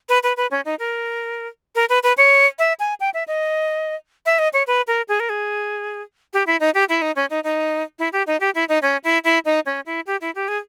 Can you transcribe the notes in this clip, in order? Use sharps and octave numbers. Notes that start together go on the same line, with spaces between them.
B4
B4
B4
C#4
D#4
A#4
A#4
B4
B4
C#5
E5
G#5
G5
E5
D#5
E5
D#5
C#5
B4
A#4
G#4
A#4
G#4
G4
E4
D#4
G4
E4
D#4
C#4
D#4
D#4
E4
G4
D#4
G4
E4
D#4
C#4
E4
E4
D#4
C#4
E4
G4
E4
G4
G#4